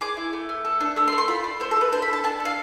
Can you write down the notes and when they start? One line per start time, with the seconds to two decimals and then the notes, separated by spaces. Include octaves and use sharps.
0.01 G#4 D6
0.17 E4
0.33 A3
0.49 A3
0.65 A4
0.80 D4
0.96 A3 E6
1.08 C6
1.12 A3
1.18 C6
1.28 F4 B5
1.44 D4
1.60 A3 C5
1.71 A4
1.76 A3 B4
1.92 D4 C5
2.02 B5
2.08 A4
2.13 A5
2.24 D4 A5
2.40 A4
2.45 F5